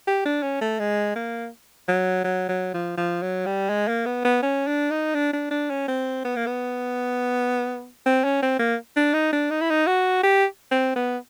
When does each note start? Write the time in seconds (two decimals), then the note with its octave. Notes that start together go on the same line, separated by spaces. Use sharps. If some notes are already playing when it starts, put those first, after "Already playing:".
0.07 G4
0.25 D4
0.43 C#4
0.61 A3
0.79 G#3
1.15 A#3
1.88 F#3
2.24 F#3
2.49 F#3
2.74 F3
2.97 F3
3.22 F#3
3.46 G3
3.69 G#3
3.88 A#3
4.06 B3
4.25 B3
4.42 C#4
4.67 D4
4.91 D#4
5.14 D4
5.33 D4
5.51 D4
5.70 C#4
5.88 C4
6.25 B3
6.36 A#3
6.46 B3
8.06 C4
8.24 C#4
8.42 C4
8.59 A#3
8.96 D4
9.14 D#4
9.33 D4
9.51 D#4
9.61 E4
9.70 D#4
9.87 F#4
10.23 G4
10.71 C4
10.96 B3